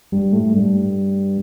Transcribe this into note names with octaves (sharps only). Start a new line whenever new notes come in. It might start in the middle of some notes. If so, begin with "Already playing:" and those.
G2
A2
G2